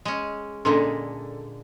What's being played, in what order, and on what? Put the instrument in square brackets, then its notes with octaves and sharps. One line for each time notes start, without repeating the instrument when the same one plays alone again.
[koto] G#3 C#4
[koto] A#2 D3 G#3 [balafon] C#4 D4 C6 [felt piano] A4